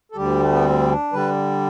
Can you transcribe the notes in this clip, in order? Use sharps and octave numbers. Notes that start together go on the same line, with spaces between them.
A4
D2 D3 G3 G4
A3
B3
C4
D4
D3 G3 B4